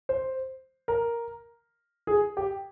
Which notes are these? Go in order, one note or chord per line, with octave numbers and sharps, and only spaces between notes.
C5
A#4
G#4
G4